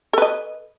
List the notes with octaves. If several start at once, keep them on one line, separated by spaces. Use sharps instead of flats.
A4 B4 D#5